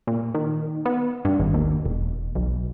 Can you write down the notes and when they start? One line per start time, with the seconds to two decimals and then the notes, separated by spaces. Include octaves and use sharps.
0.07 A#2
0.35 D#3
0.85 B3
1.25 G2
1.39 G#1
1.54 D#2
1.86 E1
2.35 B1